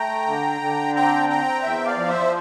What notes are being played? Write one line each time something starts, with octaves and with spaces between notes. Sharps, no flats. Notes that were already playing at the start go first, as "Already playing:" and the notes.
Already playing: A3 G5 A#5
D3
D3
C4 G5 A#5
C4 G5 A#5
E2 E5 G5
D5 F5
F3
C5 E5